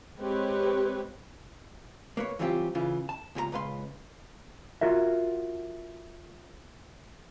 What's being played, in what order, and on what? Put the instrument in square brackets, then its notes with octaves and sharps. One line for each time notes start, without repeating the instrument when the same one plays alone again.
[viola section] G#3 C4 G4 B4 C#5
[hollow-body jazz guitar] A#3 B4 C#5
E3 F#3 G3 C4 F4 G4
C#3 E3 F4
A5
C#2 A#2 G4 A#5
C#2 A#2 B4 F5 C6
F4 F#4 A#4 E5